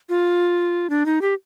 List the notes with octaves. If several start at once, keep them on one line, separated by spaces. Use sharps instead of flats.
F4
D4
D#4
G4